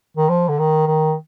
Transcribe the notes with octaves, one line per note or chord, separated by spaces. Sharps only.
D#3
F3
D3
D#3
D#3